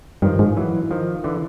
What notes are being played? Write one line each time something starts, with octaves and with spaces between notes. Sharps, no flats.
G2 D#3 F3
G#2
E3 F#3
D#3 F3
D3 E3